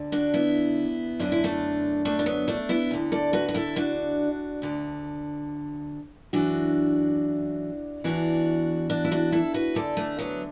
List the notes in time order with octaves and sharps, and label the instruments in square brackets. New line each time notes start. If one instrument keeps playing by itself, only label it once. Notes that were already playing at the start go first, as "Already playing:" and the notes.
Already playing: [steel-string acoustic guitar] D2 D3
D4 F#4
B3 E4
F#2 D3 D4
E4
A3 D4
A3 D4
D4
F#3 B3
A3 D4
B3 E4
D2 D3
A4 D5
F#4 B4
F#4
E4 A4
D4 F#4
D2 D3
F#2 E3 D4 F#4
E2 E3 D4 F#4
D4 F#4
E4
D4 F#4
E4 A4
F#4 B4
E2 D3 A4 D5
A3 D4
F#3 B3